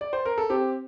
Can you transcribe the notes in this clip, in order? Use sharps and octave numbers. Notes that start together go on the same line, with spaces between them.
D5
C5
A#4
A4
C4 G4